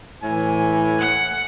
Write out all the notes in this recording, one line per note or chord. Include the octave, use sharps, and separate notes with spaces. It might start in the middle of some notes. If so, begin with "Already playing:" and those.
A2 E3 G#5
F#5